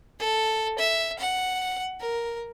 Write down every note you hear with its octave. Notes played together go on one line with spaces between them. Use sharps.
A4
E5
F#5
A#4